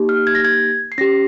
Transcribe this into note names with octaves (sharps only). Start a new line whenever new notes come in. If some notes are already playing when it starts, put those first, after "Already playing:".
Already playing: A#3 D#4 G4
F6
G#6
A#6
G#6
C7
C#4 G4 A#6